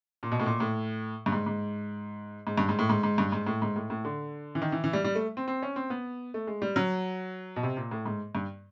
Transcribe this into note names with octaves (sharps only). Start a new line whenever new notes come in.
A#2
B2
A2
A#2
A2
G2
G#2
G#2
G#2
G2
G#2
A2
G#2
G#2
G2
G#2
A2
G#2
A2
A2
D3
E3
D#3
E3
E3
G3
G3
A3
C4
C4
C#4
C4
B3
A3
G#3
G3
F#3
B2
C3
A#2
A2
G#2
G2